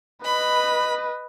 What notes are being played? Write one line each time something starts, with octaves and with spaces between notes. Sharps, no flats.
B4 D#5 B5